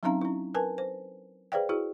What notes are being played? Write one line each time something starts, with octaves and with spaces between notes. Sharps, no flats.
F#3 C4 C#4 D#4 F5 A#5
C#4 E4
A#4 B4 G#5 A5
C5
G#4 B4 C5 D5 F5 G5
E4 F#4 G#4